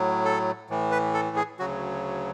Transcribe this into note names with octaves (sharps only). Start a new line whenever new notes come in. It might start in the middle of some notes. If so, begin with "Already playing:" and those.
Already playing: A2 F#3
A4
A2 E3
B4
A4
G#4
D2 C#3 F#3 F#4